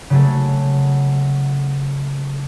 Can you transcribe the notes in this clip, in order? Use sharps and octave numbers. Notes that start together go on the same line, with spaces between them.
C#3 F#3 A3